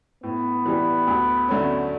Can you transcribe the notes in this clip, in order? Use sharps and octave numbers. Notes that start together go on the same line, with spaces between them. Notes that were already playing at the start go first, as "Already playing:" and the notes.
A2 B3
E3 G3
D2
D3 F#3 A3 C#4